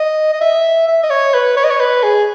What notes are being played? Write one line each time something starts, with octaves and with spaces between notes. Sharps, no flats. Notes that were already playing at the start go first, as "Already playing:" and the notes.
Already playing: D#5
D#5
E5
E5
D#5
C#5
B4
C#5
D#5
C#5
B4
G#4